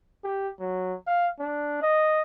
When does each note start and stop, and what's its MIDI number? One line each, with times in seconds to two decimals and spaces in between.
0.24 0.48 67
0.60 0.95 54
1.07 1.27 77
1.39 1.78 62
1.82 2.22 75